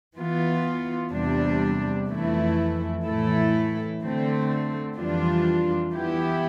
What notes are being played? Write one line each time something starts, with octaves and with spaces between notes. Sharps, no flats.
E3 B3 F4
E2 C3 G3 D4
F2 E3 A3 E4
A2 E3 A3 E4 A4
D3 A3 C4
F2 E3 G3 D4 F4
E3 B3 E4 G4